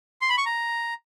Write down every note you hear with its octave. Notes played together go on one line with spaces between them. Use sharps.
C6
B5
C#6
A#5